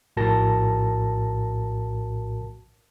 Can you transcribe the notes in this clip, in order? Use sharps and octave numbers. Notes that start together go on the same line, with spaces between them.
A#1 A2 F#4 A#4 A5 A#6